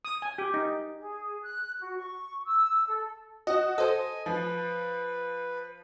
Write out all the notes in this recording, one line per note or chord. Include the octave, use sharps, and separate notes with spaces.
D#6
G#5
G4
D#4
G#4
F#6
F#4
C#6
E6
A4
F#4 D#5
A4 C5 D#5 G#5
F3 B4